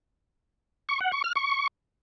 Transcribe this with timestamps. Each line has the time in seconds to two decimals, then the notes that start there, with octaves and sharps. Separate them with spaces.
0.89 C#6
1.01 F#5
1.12 C#6
1.24 F6
1.36 C#6